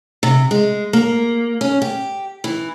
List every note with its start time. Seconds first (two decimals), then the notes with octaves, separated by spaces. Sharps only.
0.23 C3
0.51 G#3
0.93 A#3
1.61 C#4
1.82 G4
2.44 E3